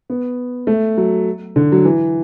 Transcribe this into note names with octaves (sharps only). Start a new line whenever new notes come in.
B3
A3
F#3
D3
F#3
E3